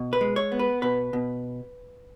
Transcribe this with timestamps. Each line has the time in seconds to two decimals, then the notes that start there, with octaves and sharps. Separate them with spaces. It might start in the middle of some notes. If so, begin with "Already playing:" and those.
Already playing: B2
0.13 B4
0.21 G#3
0.36 C#5
0.52 B3
0.59 B4
0.82 B2 B4
1.13 B2